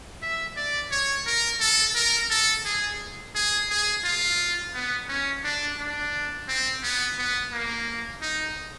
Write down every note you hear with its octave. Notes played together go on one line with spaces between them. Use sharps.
E5
D5
C#5
A#4
A4
A#4
A4
G#4
G#4
G#4
F4
B3
C#4
D4
D4
C4
B3
B3
A#3
D#4